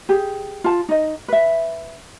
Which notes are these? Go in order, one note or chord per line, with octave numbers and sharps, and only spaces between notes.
G4 G#4
F4 A5
D#4 D#5
B4 E5